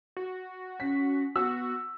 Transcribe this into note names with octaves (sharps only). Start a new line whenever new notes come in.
F#4
C#4 B6
B3 F#4 E6